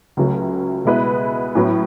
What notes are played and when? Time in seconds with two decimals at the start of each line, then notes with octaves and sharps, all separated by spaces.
0.17 C#2 C#3 F#3 A3
0.85 B2 G#3 B3 E4 B4
1.55 A2 F#3 B3